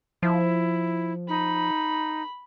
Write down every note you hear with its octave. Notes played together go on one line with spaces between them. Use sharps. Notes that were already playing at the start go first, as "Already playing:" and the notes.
F3 E4
D#4 B5